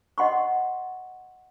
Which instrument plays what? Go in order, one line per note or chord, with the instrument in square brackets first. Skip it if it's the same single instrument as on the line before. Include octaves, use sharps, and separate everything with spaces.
[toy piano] D#5 F#5 C6 C#6